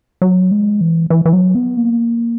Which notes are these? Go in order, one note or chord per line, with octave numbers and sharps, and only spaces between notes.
F#3
G#3
E3
E3
E3
F#3
B3
A#3